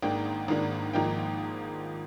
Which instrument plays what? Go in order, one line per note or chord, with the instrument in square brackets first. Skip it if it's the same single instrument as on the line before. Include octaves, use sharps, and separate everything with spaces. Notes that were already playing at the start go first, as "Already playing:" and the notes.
[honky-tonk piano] G#1 G#2 D#3 A#3 D4 G5
G#1 G#2 D#3 A#3 D4
G#1 G#2 F3 A#3 D#4 G5